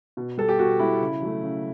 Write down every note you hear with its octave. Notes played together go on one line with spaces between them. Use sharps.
B2
G3 A4
G4
B2 F#4
G3 E4
C#3
F#3 A3
C#3